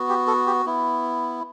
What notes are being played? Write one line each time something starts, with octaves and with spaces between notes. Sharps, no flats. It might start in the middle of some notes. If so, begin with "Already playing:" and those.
Already playing: B3 F#4
G4
A4
G4
B3 E4